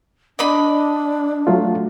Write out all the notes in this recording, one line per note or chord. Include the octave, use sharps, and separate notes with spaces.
D4 D5 D#5 B5
F#3 A3 F4